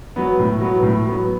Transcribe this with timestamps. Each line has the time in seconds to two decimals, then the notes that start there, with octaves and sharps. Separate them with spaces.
0.16 F#3 B3
0.39 A2
0.61 F#3 B3
0.83 A2
1.06 F#3 B3